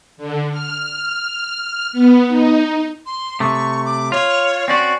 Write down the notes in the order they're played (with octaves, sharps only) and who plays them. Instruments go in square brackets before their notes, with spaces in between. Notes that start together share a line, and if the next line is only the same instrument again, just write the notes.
[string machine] D3
F6
B3
D#4
[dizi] C6
[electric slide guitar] C3 A3 [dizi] C#6
[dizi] D6
[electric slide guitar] F4 [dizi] C#5
[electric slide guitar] C4 C#4 F#4 [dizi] D5